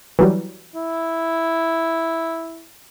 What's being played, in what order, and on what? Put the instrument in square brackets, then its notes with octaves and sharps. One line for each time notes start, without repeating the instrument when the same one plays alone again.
[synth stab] E3 F#3 G3
[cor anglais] E4